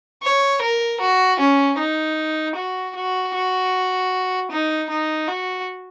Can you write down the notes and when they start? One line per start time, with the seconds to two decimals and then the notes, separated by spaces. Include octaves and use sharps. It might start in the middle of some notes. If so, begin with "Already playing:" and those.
0.23 C#5
0.62 A#4
1.00 F#4
1.39 C#4
1.78 D#4
2.56 F#4
2.95 F#4
3.34 F#4
4.51 D#4
4.90 D#4
5.28 F#4